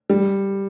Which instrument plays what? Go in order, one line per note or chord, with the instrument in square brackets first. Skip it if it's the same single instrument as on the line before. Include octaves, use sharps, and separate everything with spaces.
[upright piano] G3